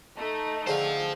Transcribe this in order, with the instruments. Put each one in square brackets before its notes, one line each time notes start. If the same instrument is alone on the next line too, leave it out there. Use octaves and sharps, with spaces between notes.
[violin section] A3 D#4
[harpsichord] D3 C4 G#4 [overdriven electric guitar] C5 F5